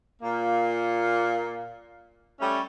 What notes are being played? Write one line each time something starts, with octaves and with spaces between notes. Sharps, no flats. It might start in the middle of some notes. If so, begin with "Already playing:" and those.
A#2 A#3
G3 A3 C#4